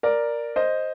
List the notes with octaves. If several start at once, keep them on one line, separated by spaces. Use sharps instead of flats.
A#4 D5
C5 D#5